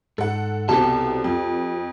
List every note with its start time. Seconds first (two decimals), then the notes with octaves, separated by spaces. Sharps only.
0.18 G#2 A4 F#5
0.69 C2 B2 C4 G4 A4 A5
1.24 F2